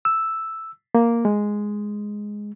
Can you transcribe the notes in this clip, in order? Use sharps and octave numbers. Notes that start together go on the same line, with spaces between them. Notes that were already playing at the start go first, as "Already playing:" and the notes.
E6
A#3
G#3